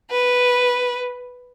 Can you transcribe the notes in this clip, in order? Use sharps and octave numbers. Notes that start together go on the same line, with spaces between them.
B4